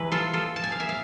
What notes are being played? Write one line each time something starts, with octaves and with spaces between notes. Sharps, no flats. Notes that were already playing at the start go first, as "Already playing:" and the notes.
Already playing: C3 E3 G#3 B4
F4 A4
F4 A4
A5
G#5
F5
E5 G#5
F5